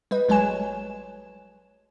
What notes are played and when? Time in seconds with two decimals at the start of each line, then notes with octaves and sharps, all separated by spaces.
0.11 G3 B4 D#5
0.29 A1 F#3 G#3 C#5 G#5 E7